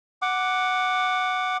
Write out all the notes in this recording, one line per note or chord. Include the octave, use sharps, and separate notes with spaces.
F#5 D6